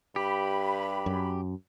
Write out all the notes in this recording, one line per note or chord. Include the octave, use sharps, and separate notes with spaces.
G2 G4 B5
F#2